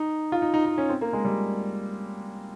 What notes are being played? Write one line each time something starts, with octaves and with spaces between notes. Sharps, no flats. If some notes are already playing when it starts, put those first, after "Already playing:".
Already playing: D#4
F4
D#4
D#4
D#4
C#4
C4
A#3
G#3
G3